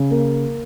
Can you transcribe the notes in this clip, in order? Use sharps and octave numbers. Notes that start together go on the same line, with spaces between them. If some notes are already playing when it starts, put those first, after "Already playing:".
Already playing: C#3
A#3